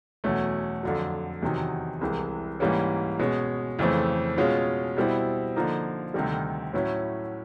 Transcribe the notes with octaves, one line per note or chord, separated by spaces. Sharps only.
E2 B2 F#3 A3 C#4
F2 D3 F#3
E2 C3 D#3 F#3
C2 C3 E3 G#3
G#2 E3 G3 A#3 C#4
B2 G#3 C#4
F2 C#3 E3 A3 C4
B2 G#3 C#4 F4
B2 G3 C4 E4
D3 F3 A#3 D#4
D2 C3 D#3 G3
A2 F#3 A3 C#4 E4